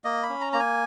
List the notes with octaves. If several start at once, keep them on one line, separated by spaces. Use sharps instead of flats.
A#3 D#5
B5
C#4
A#5
A#3 A#5
G#5